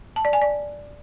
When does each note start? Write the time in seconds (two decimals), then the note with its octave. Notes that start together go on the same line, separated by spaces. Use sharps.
0.16 A5
0.25 D5
0.33 G#5
0.42 D5